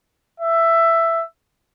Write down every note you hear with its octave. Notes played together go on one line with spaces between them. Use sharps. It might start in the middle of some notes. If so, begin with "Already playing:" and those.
E5